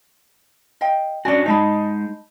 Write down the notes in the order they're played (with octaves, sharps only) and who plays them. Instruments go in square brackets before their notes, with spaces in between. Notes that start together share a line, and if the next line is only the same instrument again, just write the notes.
[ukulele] D#5 F5 G5
[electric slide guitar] C#4 D4 F#4 [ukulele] D5 G#5
[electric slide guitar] G#3 D#4 [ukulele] D#5 A5 B5